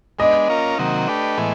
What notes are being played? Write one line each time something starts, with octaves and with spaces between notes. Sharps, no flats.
G#3 B3 D4 D#5
A#3 C#4 F4 A#4
C3 D#3 F#3 A#3
A3 D4 G4 B4
A2 E3 G#3 B3